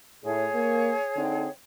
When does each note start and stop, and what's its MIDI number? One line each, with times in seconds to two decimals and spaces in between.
0.23 0.46 45
0.23 1.48 68
0.23 1.48 73
0.53 0.92 58
1.16 1.46 50
1.16 1.46 60
1.16 1.46 63